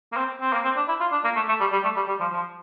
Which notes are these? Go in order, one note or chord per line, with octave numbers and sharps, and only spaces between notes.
A#3
C4
C4
A#3
C4
D4
E4
F4
D4
A#3
A3
A3
G3
G3
A3
G3
G3
F3
F3